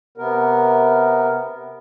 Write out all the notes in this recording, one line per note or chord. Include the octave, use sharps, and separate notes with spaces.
C3 B3 A#4